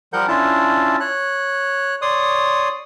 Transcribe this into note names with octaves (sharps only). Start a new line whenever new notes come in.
F3 G3 A#4 F#5 G6
C#4 D4 E4 F4 A5
C#5 F#6
C#5 D5 C6 D#6